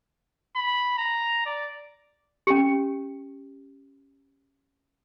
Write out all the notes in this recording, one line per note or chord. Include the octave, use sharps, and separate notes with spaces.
B5
A#5
D5
C#4 G4